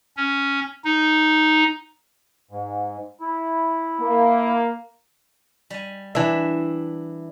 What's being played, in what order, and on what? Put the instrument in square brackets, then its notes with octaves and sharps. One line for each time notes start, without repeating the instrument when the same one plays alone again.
[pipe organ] C#4
D#4
[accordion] G#2
E4
[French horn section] A#3
[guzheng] G3 G#5
[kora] E3 E5 [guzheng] D4